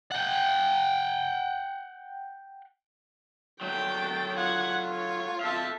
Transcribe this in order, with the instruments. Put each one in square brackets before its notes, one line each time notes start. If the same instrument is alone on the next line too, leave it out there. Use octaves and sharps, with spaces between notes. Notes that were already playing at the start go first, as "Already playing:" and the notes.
[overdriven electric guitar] F#5 G5
[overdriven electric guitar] F#3 A3 [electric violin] G5 A6
[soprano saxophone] F4 [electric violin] F#5 G#6
[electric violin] C#5
[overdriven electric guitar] A4 F5 [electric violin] E5 A5